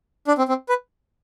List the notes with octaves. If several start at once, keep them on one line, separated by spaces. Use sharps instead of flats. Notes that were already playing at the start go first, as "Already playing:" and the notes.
D4
C4
C4
B4